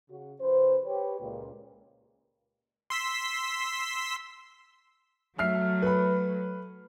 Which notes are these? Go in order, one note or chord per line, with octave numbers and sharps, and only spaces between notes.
C#3 F#4
C#3 F3 C#4 B4 C5
G4 B4 C#5
C#2 A#2
C6 E6 B6
F#3 A3 E5 F6 C7
B4 B5